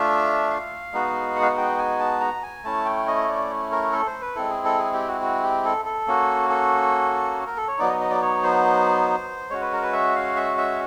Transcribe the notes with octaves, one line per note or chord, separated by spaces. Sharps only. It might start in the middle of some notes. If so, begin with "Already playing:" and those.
Already playing: A3 D4 F4 E5
F5
G#3 B3 D#4 F#4
F#5
F5
F#5
G5
G#5
A5
A#5
G#5
A3 C#4 E4 A5
G5
D#5
D5
A#4
A4
C5
B4
G#3 C4 E4 A4
G#4
A4
G#4
G4
F#4
F#4
G4
A4
A4
A#3 C#4 F#4
A4
A#4
A4
C#5
F#3 B3 D#4 D5
D#5
D#5
D5
C#5
C5
G#3 C#4 F#4 C#5
B4
A#4
B4
E5
F5
E5
E5